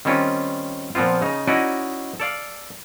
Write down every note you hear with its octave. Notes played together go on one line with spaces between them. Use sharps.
D#3 G3 C4 C#4 F4
A#2 F3 B3 C4 F4
C#3 D#4
C#4 D#4 E4 F#4 D5 D#5
A4 D5 F5